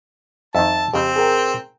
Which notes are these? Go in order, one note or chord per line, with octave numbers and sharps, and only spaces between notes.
F2 D#3 E5 A5
F2 C#3 C4 G4
G#4 A#4 G5